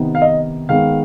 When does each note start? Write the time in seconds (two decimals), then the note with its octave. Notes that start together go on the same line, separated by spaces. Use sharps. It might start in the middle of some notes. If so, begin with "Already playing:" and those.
Already playing: C3 D#3 B3 D#4
0.15 F5
0.22 D#5
0.69 D#3 G#3 B3 F5